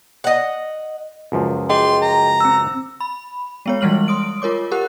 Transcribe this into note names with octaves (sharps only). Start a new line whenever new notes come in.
D#5 F#5
C#2 F#2 F3
G#4 D#5 G5 C6
A#5
C4 E6
B5
G#3 B3 C#5
E3 G3 G#3 F6 F#7
C6 D#6 D7
F4 A#4 C#5 D6
G4 A#4 F#5 F#6